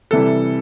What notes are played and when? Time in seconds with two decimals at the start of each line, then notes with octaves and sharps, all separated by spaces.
0.11 C3 E3 G3 A4